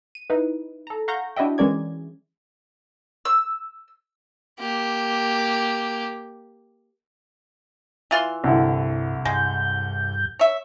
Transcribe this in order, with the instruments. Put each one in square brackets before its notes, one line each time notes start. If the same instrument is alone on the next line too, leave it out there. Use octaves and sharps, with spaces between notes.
[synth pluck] D#7
D#4 E4 B4
A4 A#5
F5 F#5 A#5 C#6 G6 A#6
D4 E4 F#4 D#5 E5 G5
E3 G#3 C#4 A#4 D5 G#6
[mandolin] E6
[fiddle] A#3 G4
[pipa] E3 F4 C6
[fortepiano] C2 D3 E4 [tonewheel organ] G2
[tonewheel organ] G2 G6 [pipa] G#3
[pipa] C#5 E5